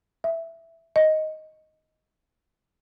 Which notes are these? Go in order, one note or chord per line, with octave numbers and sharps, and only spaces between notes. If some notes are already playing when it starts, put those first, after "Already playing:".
E5
D#5